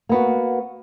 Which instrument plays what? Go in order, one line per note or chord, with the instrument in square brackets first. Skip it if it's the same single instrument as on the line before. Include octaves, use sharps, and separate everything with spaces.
[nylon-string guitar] A#3 B3 F#4